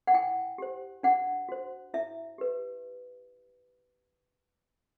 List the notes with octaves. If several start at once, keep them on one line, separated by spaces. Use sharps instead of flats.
F#5
E4 G5
G4 C5
D4 F#5
F#4 C5
E4 E5
G4 B4